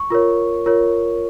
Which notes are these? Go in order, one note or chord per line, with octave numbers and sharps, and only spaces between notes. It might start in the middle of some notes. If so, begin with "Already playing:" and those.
Already playing: C#6
F4 A#4 C#5
F4 A#4 C#5